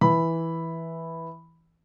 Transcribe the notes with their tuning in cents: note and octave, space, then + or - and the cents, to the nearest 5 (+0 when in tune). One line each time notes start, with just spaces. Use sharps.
E3 -5 B5 +0